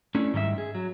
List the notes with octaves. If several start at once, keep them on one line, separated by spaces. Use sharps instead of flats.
A3 C#4 D4 E4 A4
G#2 D#3 G3 G#4 E5
G#4
F#3